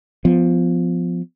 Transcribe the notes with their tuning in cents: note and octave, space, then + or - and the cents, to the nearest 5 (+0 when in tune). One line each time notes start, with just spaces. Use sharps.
F3 +0 B3 +25